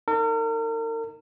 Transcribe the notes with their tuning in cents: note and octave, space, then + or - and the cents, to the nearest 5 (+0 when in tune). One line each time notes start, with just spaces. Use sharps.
D#4 +0 A#4 -40